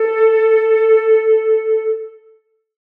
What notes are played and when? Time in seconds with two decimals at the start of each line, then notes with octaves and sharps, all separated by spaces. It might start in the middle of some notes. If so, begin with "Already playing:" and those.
Already playing: A4